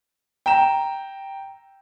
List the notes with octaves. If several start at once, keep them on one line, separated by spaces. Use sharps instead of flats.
G5 A#5 E7